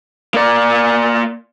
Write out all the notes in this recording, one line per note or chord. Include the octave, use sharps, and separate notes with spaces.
A#3 D5